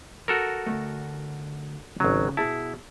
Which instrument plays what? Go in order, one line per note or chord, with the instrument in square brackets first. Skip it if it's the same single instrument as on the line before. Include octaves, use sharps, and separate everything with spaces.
[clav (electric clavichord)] F#4 A4 A#4
[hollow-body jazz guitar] D2 G#2 A3
[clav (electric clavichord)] G#1 F#3 [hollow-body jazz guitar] C#3
[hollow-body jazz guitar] B2 G#4 A5 [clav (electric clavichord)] E4